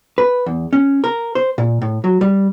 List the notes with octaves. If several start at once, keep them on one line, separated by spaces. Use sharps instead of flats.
B4
E2
C#4
A#4
C5
A#2
A2
F#3
G3